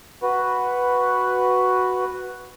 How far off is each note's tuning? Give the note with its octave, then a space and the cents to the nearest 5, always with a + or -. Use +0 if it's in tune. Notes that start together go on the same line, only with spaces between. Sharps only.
F#4 +0 B4 +0